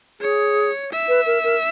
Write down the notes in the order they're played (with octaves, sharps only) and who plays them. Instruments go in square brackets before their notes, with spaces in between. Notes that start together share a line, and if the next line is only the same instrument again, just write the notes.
[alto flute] G#4 [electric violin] C#5
[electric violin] E5
[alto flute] B4
A#4
A#4